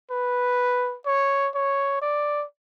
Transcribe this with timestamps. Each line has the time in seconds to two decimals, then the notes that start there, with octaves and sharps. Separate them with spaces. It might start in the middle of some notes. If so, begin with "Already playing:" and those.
0.11 B4
1.06 C#5
1.54 C#5
2.02 D5